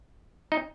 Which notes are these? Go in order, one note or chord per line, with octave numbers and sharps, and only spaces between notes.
D#4